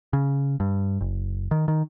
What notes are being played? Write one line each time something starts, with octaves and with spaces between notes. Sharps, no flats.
C#3
G2
F#1
D#3
D#3